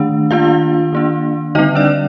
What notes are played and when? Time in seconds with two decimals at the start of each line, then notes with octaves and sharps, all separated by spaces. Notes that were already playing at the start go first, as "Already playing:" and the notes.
Already playing: D#3 A3 D4
0.31 D#3 A#3 D4 F4 F5
0.93 D#3 A#3 D4
1.55 D3 G3 C4 D#4 D#5
1.75 D4 D5